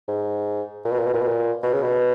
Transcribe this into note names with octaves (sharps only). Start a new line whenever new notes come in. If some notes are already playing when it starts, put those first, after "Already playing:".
G#2
A#2
B2
A#2
B2
A#2
B2
A#2
B2
C#3
B2